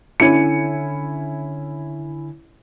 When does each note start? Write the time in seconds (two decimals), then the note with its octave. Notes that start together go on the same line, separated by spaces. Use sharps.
0.20 D3 C#4 E4 G#5 C#7